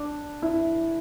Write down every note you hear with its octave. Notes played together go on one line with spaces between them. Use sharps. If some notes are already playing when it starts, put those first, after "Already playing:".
Already playing: D4
E4